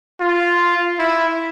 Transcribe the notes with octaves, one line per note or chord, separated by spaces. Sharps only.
F4
E4